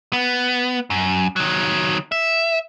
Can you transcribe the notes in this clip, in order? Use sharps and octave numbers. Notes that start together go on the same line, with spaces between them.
B3
F#2
D#3 F#3
E5